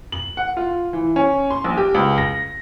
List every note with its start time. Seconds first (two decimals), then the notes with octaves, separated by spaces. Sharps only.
0.12 F#7
0.37 F#5
0.57 F4
0.93 E3
1.16 C#4
1.50 C6
1.64 A#1
1.77 G4
1.94 C#2
2.18 A#6